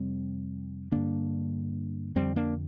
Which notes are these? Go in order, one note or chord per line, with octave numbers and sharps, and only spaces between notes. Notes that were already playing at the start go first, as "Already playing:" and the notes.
Already playing: F2 C3 G3 C4
G2 D3 A#3 D4
F2 D3 G3 C4
A#3 D4